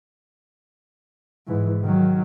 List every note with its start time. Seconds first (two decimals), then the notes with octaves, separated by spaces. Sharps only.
1.47 G#2 E3
1.81 D#3 F#3